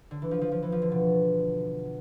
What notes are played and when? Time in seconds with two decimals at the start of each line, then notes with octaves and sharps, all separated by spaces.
0.11 D3
0.22 E3
0.31 F3
0.41 F3
0.52 F3
0.62 E3
0.72 F3
0.82 D3
0.92 B2